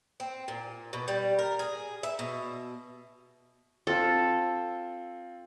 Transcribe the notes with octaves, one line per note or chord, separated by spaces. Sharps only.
C4
A#2
B2
G3
A#4
G#4
E5
B2
C4 F4 A4